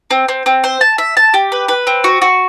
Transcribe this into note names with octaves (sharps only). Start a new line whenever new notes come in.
C4
C4
C4
C5
A5
E5
A5
G4
B4
B4
C4
F#4
F#4